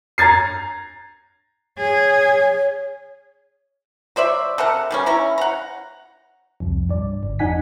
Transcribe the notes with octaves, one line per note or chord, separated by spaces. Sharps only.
A#5 G#6 A6 C7
G#4 C#5
F#3 C5 D5 E5
C3 A4 A#4 F#5
D#3 G3 C#4
C#4 E4 A#5
F#5 A#5
C2 F2
G2 D5
G1
F2 D4 D#4 F#5 G#5 B6